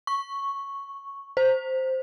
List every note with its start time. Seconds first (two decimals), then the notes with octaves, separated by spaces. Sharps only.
0.07 C#6
1.37 C5